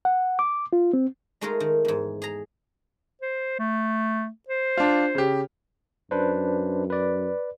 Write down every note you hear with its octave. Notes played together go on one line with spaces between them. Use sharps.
F#5
D6
F4
C4
G#3 A3 D#4 F4 G#4 A#4
D#3
E2 G#2
G#4 A#5
C5
A3
C5
D4 F4
C#3 G4
F#2 D4 B4 C5
B4 D5